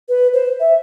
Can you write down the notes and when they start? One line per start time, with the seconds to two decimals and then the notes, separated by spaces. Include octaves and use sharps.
0.09 B4
0.33 C5
0.60 E5